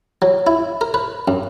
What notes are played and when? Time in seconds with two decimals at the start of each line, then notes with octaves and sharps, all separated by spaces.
0.22 F#3
0.47 E4
0.81 A#4
0.94 B4
1.28 F#2